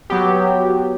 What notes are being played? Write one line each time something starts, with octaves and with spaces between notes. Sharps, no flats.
F#3 B3 G4